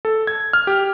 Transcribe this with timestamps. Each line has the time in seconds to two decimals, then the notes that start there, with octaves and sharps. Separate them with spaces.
0.05 A4
0.27 G#6
0.53 F6
0.67 G4